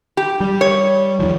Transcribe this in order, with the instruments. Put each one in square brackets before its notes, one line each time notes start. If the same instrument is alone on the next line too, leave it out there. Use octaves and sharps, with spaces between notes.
[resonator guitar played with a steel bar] G4
[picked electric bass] G3
[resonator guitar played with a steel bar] C#5
[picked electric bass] D#2 D#3 F3